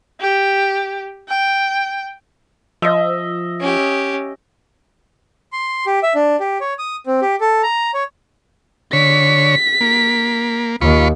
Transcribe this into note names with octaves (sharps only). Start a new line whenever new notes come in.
G4
G5
F3 D#5 E5
C#4 G4
C6
G4
E5
D4
G4
C#5
D#6
C4
G4
A4
A#5
C#5
D3 C#5 B6
A#3
D#2 F4 B5 C#6